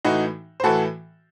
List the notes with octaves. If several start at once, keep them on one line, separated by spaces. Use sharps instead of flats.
A2 E3 D#4 F#4
C5
A2 E3 F#4 A4